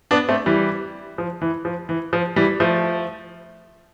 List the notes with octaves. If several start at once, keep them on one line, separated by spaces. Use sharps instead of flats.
B3 D4
A3 C4
E3 G3
F3
E3
F3
E3
F3
E3 G3
F3 A3